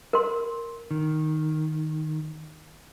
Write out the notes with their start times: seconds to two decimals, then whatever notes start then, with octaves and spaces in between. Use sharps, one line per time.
0.13 A#4 C6
0.91 D#3